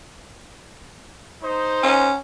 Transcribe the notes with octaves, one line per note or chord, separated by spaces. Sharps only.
D#4 C5
C#4